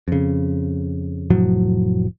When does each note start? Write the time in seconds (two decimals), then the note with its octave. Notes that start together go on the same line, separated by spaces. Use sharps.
0.08 F2 C#3
1.30 F1 A2 F3 F#3